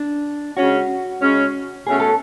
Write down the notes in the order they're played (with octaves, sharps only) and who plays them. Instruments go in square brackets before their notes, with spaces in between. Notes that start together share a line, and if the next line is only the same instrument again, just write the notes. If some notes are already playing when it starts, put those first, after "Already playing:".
Already playing: [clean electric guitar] D4
[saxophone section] C#3 G#3 C#4 [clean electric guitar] F#4
[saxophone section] C#3 G#3 C#4
[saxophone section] B2 A3 C#4 [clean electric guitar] G#4
[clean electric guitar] A4